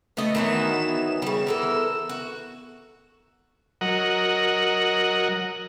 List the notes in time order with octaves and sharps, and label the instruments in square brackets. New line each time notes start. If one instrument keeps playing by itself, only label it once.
[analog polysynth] A3 [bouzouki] B3 D#5
[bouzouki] D#3 E3 F#3 [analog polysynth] B3 E7
[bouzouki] C#3 G3
E3 A4 A#4
F#4
[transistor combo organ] F#3 A#4 D#5 F#5